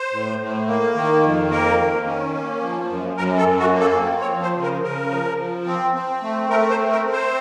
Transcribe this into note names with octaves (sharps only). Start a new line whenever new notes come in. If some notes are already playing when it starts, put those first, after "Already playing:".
Already playing: C5
A2
A2
A#3
D#3
F2
A#3 A#4
D#3
C#4
A#3
F3
F#2
F#2 A#4
A4
F#2
F#4
A#3
A4
C4
C#5
F3
C5
C#3
A#4
C#3 A#4
F3
F3
C4
C4
A3
A3 A#4
C5
C4
A#4
C4
C5